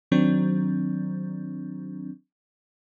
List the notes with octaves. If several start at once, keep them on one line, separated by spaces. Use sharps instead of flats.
D#3 F#3 C4 D4